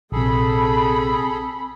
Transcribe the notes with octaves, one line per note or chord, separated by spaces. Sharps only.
A#1 C3 C4 G#4 A4 B5